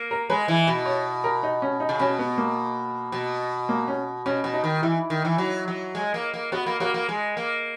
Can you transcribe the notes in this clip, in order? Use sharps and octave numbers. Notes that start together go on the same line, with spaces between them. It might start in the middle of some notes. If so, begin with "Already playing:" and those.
Already playing: A#3
A#4
G#3 B4
E3
B2
C#5
A#4
D#4
C#4
D#4
C#3
B2 C#4
B3
A#3
B2
A#3
C#4
B2 C#4
B2
D#4
D#3
E3 E4
D#3
E3
F#3
F#3
G#3
A#3
A#3
B3 F#4
A#3
A#3 F#4
A#3
G#3
A#3